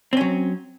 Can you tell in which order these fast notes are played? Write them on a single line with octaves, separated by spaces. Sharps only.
C4 C#4 F#3